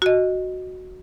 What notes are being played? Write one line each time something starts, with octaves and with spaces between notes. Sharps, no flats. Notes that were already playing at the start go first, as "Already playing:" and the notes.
F#4 D#5